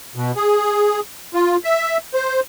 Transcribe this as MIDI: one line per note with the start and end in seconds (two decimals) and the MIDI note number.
0.16 0.32 47
0.36 1.00 68
1.34 1.56 65
1.64 1.97 76
2.14 2.40 72